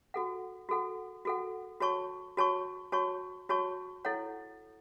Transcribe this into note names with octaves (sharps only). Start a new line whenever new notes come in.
F#4 A4 F#5
F#4 A4 F#5
F#4 A4 F#5
F#4 C#5 A5 C#6
F#4 C#5 A5 C#6
F#4 C#5 A5 C#6
F#4 C#5 A5 C#6
E4 A4 C#5 F#5